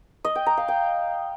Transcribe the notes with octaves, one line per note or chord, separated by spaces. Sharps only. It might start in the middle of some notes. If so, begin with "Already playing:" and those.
D#5
G5
A#5
F5
G5